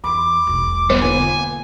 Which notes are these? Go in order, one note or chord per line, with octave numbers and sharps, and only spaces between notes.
E2 B5 C6 D6 D7
E1 B1
G3 B3 C5 D5
A#2 D3 B3 G#5